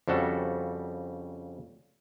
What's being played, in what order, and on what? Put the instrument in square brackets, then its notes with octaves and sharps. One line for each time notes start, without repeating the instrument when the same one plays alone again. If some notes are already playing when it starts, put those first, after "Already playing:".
[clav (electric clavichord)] F2 C#3 G3 F#4 A4